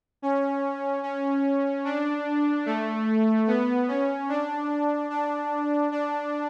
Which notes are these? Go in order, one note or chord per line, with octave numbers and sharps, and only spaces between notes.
C#4
C#4
D4
A3
B3
C#4
D4
D4
D4